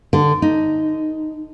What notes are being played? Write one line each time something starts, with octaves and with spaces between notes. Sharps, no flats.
D3
D#4